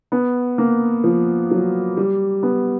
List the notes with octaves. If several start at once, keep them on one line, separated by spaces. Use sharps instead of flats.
B3
A#3
F3
F#3
G3
B3